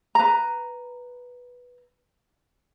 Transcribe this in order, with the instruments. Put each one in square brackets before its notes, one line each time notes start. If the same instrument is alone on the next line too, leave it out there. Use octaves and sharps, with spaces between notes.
[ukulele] B4 A#5